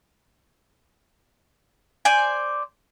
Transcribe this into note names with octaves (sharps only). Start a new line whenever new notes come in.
C5 D5 G#5